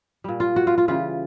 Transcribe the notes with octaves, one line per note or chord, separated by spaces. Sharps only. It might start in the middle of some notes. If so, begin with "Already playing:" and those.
A#2 G3
F4
F#4
F4
F4
C#3 E3 G3 F4